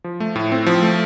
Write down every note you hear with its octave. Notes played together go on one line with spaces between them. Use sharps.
F3
A3
A2
C4
F3
A3